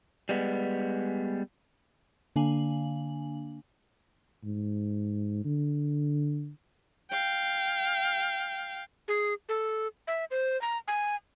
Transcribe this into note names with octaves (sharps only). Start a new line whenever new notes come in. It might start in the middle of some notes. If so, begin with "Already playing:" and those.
G3 G#3 B3
D3 A#3 D4 F5 G#5 F#7
G#2
D3
F5 G5
G#4
A4
E5
C5
A#5
G#5